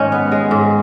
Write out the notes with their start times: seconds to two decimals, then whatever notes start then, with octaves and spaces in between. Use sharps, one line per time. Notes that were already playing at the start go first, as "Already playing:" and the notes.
Already playing: G#2 D#3 G#3 C#4
0.12 B3
0.32 G#3
0.51 G#2